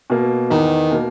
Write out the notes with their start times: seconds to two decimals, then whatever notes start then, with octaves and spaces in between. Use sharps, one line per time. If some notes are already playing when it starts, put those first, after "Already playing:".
0.10 B2 A#3
0.50 E2 D#3
0.91 B2 A#3